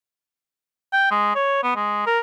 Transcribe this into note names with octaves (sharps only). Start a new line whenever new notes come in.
G5
G#3
C#5
B3
G#3
A#4